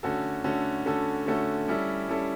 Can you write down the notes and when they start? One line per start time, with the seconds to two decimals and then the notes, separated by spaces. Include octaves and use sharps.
0.03 D3 A3 C#4 F#4 A4
0.44 D3 A3 C#4 F#4 A4
0.86 D3 A3 C#4 F#4 A4
1.26 D3 A3 C#4 F#4 A4
1.68 G3 C#4 E4 A4
2.09 G3 C#4 E4 A4